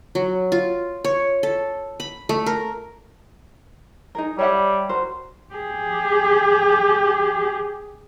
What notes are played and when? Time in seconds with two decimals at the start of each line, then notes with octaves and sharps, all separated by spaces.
0.15 F#3
0.52 F4
1.04 C#5
1.43 A4
2.00 B5
2.29 A3
2.46 A#4
4.15 D#4 G#4 A#4
4.39 G3 C#5 E5 F#5
4.89 F#4 A#4 C5
5.54 G4 G#4